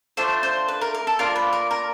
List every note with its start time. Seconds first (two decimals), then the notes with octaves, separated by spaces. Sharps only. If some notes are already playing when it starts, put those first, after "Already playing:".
0.17 A3 D4 F4 C5
0.43 C5
0.68 B4
0.81 A#4
0.95 A#4
1.07 A4
1.19 A#3 D4 F4 A#4
1.36 B4
1.53 A#4
1.71 A#4